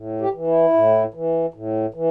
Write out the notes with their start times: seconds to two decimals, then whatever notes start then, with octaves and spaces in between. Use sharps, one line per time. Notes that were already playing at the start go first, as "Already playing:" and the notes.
Already playing: A2
0.21 G4
0.34 E3
0.47 E4
0.74 A2
1.14 E3
1.54 A2
1.94 E3